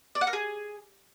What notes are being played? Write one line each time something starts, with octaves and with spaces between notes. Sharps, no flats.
D5
F#5
A#4
G#4